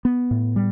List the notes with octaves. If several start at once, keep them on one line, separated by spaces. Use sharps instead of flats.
B3
A2
G3